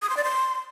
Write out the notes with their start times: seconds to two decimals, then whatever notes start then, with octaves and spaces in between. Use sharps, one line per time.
0.02 D#6
0.09 C6
0.17 D5
0.24 C6